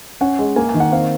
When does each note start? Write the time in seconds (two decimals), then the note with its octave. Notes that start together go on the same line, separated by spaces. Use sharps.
0.21 C#4 F#5
0.39 G#3
0.56 A#3 G#5
0.69 G#5
0.74 D#3
0.80 F#5
0.92 C4 F5